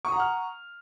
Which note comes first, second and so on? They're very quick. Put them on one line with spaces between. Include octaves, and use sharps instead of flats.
C#6 D#6 A#5 F#5 F6